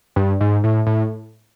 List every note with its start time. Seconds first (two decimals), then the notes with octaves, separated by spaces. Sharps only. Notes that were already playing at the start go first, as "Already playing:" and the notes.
0.16 G2
0.41 G#2
0.64 A2
0.86 A2